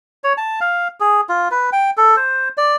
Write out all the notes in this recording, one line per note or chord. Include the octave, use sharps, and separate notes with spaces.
C#5
A5
F5
G#4
F4
B4
G5
A4
C5
D5